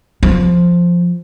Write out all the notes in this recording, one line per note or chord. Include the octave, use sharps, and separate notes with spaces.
F3